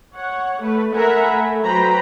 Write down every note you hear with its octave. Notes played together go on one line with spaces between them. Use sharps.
C#5 F#5
A3 B4
A#4 E5 F#5 G#5 A#5 B5
A3
F#3 B4 C5 G5 A#5 B5